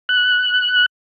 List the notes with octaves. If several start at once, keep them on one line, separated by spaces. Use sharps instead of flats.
F#6